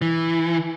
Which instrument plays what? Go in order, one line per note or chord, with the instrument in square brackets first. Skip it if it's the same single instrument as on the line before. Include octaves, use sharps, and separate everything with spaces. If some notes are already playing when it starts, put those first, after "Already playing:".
[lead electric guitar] E3